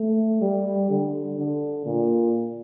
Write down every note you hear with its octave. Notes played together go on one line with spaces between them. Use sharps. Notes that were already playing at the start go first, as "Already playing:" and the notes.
Already playing: A3
G3
D3
D3
A#2